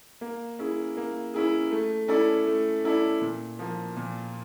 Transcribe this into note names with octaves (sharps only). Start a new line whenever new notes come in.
A#3
C#4 E4 G#4
A#3
C#4 E4 G#4
A3
C#4 E4 A4 D5
A3
C#4 E4 A4 D5
A#2
F3 A#3
A#2